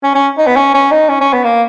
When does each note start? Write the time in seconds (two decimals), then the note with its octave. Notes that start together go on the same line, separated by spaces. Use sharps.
0.03 C#4
0.15 C#4
0.38 D#4
0.47 B3
0.56 C#4
0.74 C#4
0.91 D#4
1.09 C#4
1.21 C#4
1.33 B3
1.44 A#3